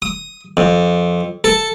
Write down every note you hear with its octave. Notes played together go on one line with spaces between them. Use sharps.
D#6
F2
A4